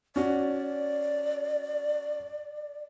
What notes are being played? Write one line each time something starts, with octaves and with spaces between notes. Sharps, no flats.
C#4 F#4 D5